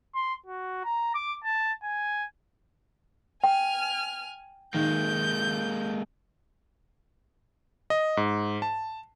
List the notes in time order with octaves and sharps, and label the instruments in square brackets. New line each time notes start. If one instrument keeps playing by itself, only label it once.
[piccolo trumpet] C6
F#4
A#5
D6
A5
G#5
[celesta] G5 [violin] G#5 F6
[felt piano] D#3 [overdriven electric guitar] G#3 A#3 [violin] G6
[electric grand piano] D#5
G#2
A5